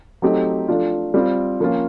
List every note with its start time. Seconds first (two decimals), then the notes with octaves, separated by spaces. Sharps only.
0.22 F#3 A3 C4 D#4 G4
0.68 F3 A3 D4 F4
1.14 G3 C4 F4
1.60 F3 A#3 C#4 F4